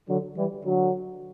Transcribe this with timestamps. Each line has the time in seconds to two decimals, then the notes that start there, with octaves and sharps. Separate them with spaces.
0.09 D3 F#3
0.37 E3 G3
0.65 D3 F#3